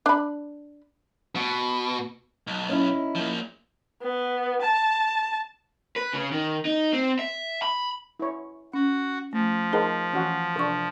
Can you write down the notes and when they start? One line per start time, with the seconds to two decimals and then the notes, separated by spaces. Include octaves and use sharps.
0.06 D4 B5
1.36 B2
2.47 B1
2.69 C#4 D#4 E4
3.15 F3 A#3
4.02 B3
4.61 A5
5.96 B4
6.13 C#3
6.32 D#3
6.65 D#4
6.93 C4
7.19 E5
7.62 B5
8.19 E4 C#5
8.74 C#4 F#4
9.33 F3 A3
9.73 D#4 G#4 A#4 C5 A5
10.13 E3 C#4 F#4
10.56 C3 D4 A4 C#6